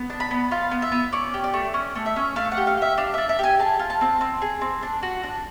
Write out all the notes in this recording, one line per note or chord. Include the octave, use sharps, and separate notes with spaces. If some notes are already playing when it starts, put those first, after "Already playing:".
Already playing: B3
D4
B5
B3
F4 F5
B3
E5
B3
C#4 D5
G4
D5
A3
C#4
A3
E5
C#4
A3 F5
F#5
G4
F5
G4 E5
D4 F5
D4 E5
E5
G4 G#5
G#4 A5
F4
A5
C4
C4
G#4
C4
D4
F#4
D4